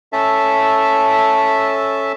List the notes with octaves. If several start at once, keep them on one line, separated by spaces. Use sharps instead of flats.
C#4 A4 E5 A5